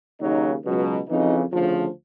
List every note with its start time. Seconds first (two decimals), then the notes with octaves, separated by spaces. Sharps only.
0.20 D#2 C#3 F#3 D#4
0.64 C#2 B2 F#3
1.08 F2 C#3 E3 D#4
1.53 D2 C#3 F3